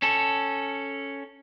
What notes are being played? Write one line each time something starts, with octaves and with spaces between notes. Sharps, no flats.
C#4 A4